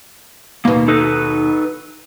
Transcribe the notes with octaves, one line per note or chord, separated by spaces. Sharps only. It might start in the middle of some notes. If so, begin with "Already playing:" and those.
D#2 B2 A#3
D#4 A4 B4